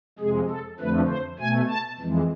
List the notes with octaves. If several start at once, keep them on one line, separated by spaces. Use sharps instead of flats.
F2 C3 G#3 G#4
A4
F2 D3 F3 A3 B4
C5
B2 A3 G#5
A5
F2 E3 G#3